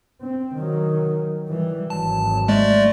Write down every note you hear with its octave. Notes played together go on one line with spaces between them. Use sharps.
C4
D#3 F#3
E3 G3
G#1 F#3 A5
G#3 A3 D5